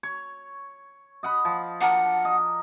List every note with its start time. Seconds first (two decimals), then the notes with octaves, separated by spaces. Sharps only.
0.03 C#5
1.23 D#5 F#5 B5
1.45 F3
1.81 D4 A#4 F#5
2.25 D#5